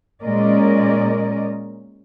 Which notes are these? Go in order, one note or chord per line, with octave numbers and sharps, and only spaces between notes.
A#2 G#3 C#4 A#4 D5 D#5